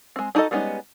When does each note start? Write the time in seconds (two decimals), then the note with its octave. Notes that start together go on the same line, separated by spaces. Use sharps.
0.16 G#3 C4
0.35 D4 D#4 F#4 A4 D#5
0.51 G3 G#3 B3 C#4 D#4